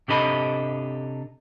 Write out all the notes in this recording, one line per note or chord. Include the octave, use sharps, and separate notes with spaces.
C3 D4 G4 A4 D#5 B5